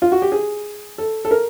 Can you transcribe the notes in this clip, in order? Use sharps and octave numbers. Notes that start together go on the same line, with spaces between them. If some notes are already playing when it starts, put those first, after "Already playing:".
F4
F#4
G4
G#4
A4
A4
A#4